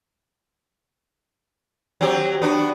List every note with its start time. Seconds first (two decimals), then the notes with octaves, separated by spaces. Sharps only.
2.01 F#3 C4 G4
2.42 B3 D4 F#4